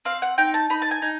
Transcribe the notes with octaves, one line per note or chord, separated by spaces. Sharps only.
C4 F5
F#5
D#4 G5
A5
D#4 B5
A5
G#5
D#4